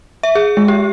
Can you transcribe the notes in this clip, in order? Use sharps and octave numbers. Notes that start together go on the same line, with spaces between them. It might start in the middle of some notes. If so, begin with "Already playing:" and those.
E5
G#4
G#3
G4